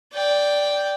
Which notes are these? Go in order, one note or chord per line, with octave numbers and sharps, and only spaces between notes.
D5 G5